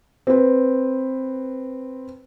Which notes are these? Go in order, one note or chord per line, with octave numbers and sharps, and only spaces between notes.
C4 B4